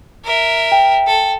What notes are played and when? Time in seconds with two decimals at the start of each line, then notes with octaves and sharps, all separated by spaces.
0.25 A#4 E5
0.72 G5
1.07 A4